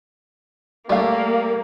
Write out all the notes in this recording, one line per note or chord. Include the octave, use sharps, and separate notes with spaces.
G3 A3 A#3 F5